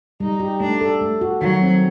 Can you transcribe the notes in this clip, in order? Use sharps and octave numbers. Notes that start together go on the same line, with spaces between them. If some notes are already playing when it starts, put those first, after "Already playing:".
G3 D#4
G4
A3 D4
A4
A3
F#4
D#3 F#3
C4